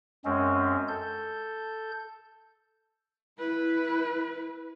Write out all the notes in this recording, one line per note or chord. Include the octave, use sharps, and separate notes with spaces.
F#2 G#3 C4 C#4
A4 G6
E4 B4